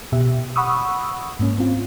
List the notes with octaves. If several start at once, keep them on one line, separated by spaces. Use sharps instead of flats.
B2 G4 E5
F#5 B5 C#6 D#6 E6
G#2 A#3 C#4
C4 F4